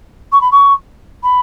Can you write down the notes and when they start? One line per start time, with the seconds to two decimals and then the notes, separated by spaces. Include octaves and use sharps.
0.32 C#6
0.41 B5
0.52 C#6
1.23 B5